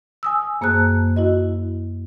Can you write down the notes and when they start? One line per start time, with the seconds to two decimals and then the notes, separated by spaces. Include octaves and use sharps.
0.23 G#5 D#6 E6
0.61 F#2 A#3 G#4 C5 A5 F#6
1.16 E4 F#4 D#5